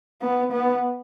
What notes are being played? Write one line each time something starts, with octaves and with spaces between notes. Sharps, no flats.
B3
B3